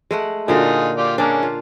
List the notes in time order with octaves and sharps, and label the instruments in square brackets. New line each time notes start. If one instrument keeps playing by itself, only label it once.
[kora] G#3 A3 F#5
[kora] A#2 D3 F#4 [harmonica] D#4 F4 G#4
[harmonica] F4 G4 D5
[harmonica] G#3 C#4 [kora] A#3 D4
[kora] F4